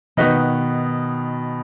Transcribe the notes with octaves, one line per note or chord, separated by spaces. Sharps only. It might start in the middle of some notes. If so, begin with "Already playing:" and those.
B2 D#3 D#4 F#4 B4 D#5